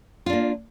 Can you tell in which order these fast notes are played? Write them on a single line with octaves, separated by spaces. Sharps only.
F4 D4 A#3